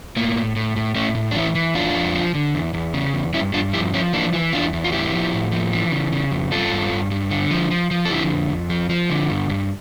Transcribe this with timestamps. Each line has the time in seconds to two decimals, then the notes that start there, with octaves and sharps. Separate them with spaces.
0.17 A2 A#3
0.36 A2
0.56 A2
0.76 A2
0.95 A2 A3 C#4
1.15 A2
1.31 D4
1.35 E3 C#4 E4
1.55 E3
1.75 F2 D4 F4
1.95 F2
2.15 F3
2.35 D3
2.55 E2
2.74 E2
2.94 C#3
3.14 E2
3.33 G2 C#4 E4
3.54 G2 D4 F4
3.73 F3 E4 G4
3.93 F3 C#4 E4
4.13 E3 A#3 D4
4.33 E3
4.53 E2 D4 F4
4.73 E2
4.84 F4
4.92 A2 E4 G4
5.13 F3
5.33 A2
5.52 F3
5.73 E3
5.92 C#3
6.13 C#3
6.31 F2
6.52 G2 F4 A4
6.72 G2
6.91 G2
7.11 G2
7.31 D3
7.51 F3
7.71 F3
7.91 F3
8.05 A4
8.10 D3 E4 G4
8.30 F2
8.50 F2
8.70 F3
8.90 F3
9.10 D3
9.30 G2
9.49 G2